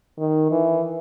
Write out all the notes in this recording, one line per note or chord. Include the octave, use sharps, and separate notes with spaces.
D#3
E3